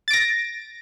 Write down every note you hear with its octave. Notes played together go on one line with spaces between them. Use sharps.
A6 A#6 D7